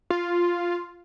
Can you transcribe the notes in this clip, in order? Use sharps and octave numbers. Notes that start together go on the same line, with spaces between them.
F4